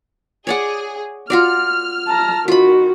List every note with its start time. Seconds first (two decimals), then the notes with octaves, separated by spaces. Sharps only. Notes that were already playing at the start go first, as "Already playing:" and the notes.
0.47 G#4 C#5 D5 F#5
1.30 F4 F#4 D5 F6
2.07 A5 A#5
2.48 D#3 F4 F#4 B5